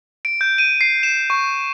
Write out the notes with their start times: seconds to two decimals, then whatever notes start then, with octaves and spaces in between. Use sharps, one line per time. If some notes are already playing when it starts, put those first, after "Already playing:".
0.25 D7
0.41 G6
0.58 D#7
0.81 C7
1.03 E7
1.30 C#6